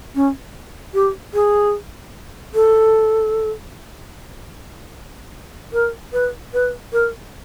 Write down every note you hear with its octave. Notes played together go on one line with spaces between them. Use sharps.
C#4
G4
G#4
A4
A#4
B4
B4
A#4